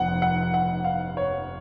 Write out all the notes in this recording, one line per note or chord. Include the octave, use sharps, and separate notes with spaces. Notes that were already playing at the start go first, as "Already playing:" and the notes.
Already playing: F1 F2 F3 B3 F#5
F#5
F#5
F5
C#5